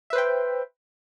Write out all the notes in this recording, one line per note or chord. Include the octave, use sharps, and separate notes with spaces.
B4 C5 E5 G5